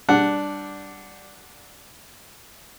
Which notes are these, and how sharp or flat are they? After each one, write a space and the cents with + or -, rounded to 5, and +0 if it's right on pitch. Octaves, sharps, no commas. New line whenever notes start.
G3 +0 D4 +0 F#5 +0